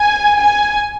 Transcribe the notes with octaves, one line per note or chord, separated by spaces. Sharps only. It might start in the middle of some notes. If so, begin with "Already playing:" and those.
Already playing: G#5
G#5